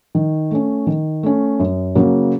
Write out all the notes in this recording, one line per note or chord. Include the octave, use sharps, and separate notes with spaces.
D#3
A3 C#4
D#3
A3 C#4
F#2
C#3 F#3 A#3